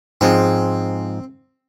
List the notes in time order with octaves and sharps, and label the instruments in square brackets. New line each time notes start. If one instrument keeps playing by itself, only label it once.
[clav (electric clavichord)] G#2 F3 G#3 [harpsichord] C4